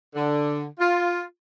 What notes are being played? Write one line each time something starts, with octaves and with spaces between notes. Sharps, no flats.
D3
F4